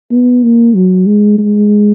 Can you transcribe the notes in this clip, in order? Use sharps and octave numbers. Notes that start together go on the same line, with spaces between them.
B3
A#3
F#3
G#3
G#3